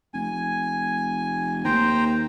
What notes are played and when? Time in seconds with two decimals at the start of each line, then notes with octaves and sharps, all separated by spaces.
0.14 F1 G#5
1.65 D#2 C5 G5 A#5